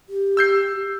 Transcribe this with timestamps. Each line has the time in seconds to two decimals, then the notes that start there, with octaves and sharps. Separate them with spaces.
0.09 G4
0.37 E6 G6 C7